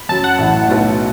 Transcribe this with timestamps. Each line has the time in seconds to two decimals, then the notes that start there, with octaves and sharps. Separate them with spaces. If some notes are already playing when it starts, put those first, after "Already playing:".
Already playing: B5
0.09 F#2 F#3 C#4 A5
0.24 F#5
0.38 A1 A2 A3
0.67 B1 B2 F#3 A3